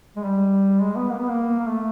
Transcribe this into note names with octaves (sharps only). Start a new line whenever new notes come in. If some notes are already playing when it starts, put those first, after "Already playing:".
G#3
G3
G#3
B3
A#3
B3
A#3
A#3
A3